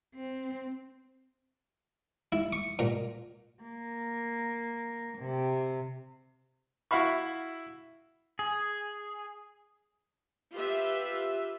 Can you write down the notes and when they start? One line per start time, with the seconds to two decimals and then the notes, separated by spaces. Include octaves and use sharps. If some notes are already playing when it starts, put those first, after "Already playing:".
0.15 C4
2.32 E4
2.53 C#6
2.79 A#2
3.63 A#3
5.19 C3
6.91 E4 F#4 E5 F5 B5 C#6
8.39 G#4
10.52 F4 G4 B4 E5